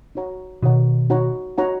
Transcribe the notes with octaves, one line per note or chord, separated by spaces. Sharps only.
D#4 F#4 C#5 F#5 A#5
B2 D#3 D#4 F#4 C#5 F#5 A#5
D#4 F#4 C#5 F#5 A#5
D#4 F#4 C#5 F#5 A#5